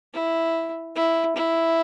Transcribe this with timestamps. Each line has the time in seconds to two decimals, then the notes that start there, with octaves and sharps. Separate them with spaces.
0.14 E4
0.96 E4
1.36 E4